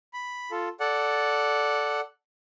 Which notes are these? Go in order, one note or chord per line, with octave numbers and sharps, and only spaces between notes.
B5
F4 A4
A4 D5 F#5